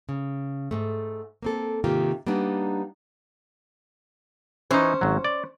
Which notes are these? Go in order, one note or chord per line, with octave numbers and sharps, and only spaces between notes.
C#3
G#2 A3
A#3 C4 A4
G#2 C3 D#3 A#3 F4 G4
G3 A#3 B3 D4 D#4
E3 C#4 D#4 C5
G#1 F#3
D5